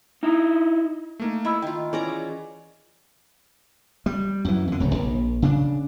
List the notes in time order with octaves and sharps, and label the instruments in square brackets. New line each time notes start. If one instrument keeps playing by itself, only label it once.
[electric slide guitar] D#4 E4
[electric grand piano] A3 A#3 D#4
[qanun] E4 [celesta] D#5 B5 E6
[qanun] D#3 F4 [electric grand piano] G5
[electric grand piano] E3 [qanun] C#4 D5 A#5 [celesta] G#4
[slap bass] G3
F#2 E3
F2 D3
D1 C#3
A#1
C#3 D4